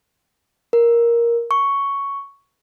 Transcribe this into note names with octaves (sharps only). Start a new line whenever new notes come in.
A#4
C#6